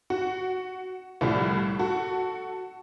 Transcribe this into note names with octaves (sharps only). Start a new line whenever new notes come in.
F#4
C2 A2 F3 G3
F#4 A4